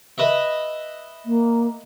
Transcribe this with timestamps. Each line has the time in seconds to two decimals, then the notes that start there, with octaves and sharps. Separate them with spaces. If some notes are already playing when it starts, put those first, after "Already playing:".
0.18 B4 D#5 E5
1.25 A#3